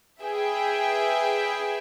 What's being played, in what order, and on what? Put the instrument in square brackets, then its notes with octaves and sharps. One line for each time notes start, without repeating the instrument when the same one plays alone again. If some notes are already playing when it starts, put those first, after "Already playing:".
[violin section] G#4 B4 E5 G5